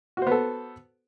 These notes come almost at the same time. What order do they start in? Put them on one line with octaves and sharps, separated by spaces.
F#4 C5 B3 A4